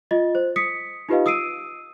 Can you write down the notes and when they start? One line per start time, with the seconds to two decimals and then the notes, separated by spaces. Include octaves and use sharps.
0.11 F4 D#5 A6
0.35 C5
0.56 D#6 B6 C#7
1.09 D#4 F4 G4 B4 D#5 F5
1.26 D#6 E6 C7 D7 D#7